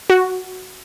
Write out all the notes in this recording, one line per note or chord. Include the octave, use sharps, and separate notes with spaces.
F#4